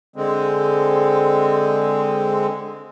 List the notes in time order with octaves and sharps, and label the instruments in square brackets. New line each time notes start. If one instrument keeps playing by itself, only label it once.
[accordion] D3 G#3 C4